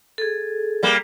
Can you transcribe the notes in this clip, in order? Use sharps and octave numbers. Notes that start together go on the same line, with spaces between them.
G#4 A4
G3 A#3